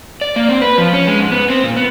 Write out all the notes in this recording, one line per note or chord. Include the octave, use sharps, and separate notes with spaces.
D5
A#3
C4
B4
F3
C#4
G#3
G#2
B3
C4
A#2
B3